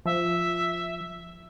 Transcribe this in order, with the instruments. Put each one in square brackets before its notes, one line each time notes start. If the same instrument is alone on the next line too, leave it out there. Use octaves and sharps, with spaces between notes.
[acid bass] F3 [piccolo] E5